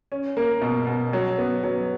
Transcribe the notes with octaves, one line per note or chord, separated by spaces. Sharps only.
C#4
A#3
B2
B2
F#3
B3
F#3